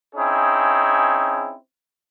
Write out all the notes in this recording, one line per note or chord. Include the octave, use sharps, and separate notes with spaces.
C4 C#4 D#4 E4 G#4